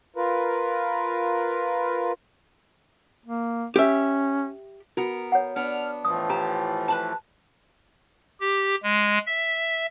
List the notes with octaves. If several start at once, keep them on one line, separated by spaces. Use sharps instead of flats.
F4 A#4 B4
A#3
C#4 G4 E5
B3 F#4 A#4
C#5 F#5
B3 D4 F6
A2 E3 F3 D#6
G4 A#5
B4 A5
G4
G#3
E5